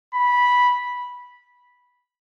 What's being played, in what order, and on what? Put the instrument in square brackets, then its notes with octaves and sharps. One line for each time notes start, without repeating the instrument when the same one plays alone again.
[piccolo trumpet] B5